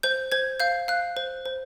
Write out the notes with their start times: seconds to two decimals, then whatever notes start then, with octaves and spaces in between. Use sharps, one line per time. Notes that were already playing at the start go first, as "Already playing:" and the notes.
0.03 C5 G6
0.32 C5 G#6
0.60 F5 G6
0.88 F5 F#6
1.17 C5
1.45 C5